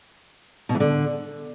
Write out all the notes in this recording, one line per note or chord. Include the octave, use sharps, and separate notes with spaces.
B2
E3
D3